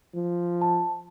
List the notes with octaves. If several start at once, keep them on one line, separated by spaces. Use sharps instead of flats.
F3
A5